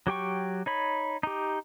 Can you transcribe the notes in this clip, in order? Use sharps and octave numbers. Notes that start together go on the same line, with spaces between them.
F#3 G4 G5 C#6
D#4 C#5 B5
D#4 G4